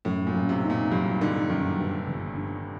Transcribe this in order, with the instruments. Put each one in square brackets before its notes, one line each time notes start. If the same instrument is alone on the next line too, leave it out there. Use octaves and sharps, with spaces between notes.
[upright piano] F#2 [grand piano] A2
[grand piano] A#2
[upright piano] F#2
[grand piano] C3
[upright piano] D#4
[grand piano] A#2
[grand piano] G2 [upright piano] F#3
[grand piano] D3 [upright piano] D#4
[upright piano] F#2 [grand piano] D#3
[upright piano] G2
G1
G2